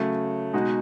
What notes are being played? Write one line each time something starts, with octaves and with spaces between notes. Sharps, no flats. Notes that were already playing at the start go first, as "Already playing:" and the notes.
Already playing: C#3 F#3 A3
B2 G#3 D#4 F#4